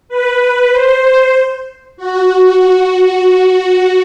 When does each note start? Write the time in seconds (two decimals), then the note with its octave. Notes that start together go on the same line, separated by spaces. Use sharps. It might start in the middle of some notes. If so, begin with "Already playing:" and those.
0.09 B4
0.72 C5
1.97 F#4